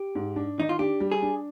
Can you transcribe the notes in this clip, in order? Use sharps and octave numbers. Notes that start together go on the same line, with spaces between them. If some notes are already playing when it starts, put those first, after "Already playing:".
Already playing: G4
G#2
D4
D#3 D#4
F4
D4 G4
G3
G#4
D4